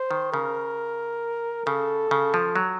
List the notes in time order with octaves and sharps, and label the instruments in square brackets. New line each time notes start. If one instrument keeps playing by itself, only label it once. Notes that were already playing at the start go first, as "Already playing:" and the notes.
Already playing: [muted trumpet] C5
[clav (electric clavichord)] D#3
[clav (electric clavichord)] C#3 [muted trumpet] A#4
[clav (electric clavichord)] C#3 [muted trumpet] A4
[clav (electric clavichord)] C#3
F3
F#3